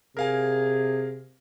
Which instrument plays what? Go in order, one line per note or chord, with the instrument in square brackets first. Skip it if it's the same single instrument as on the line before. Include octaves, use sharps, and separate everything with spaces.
[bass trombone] C3 [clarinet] G#4 [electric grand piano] A#4 F5 G#5